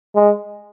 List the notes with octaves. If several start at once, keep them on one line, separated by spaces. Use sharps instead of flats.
G#3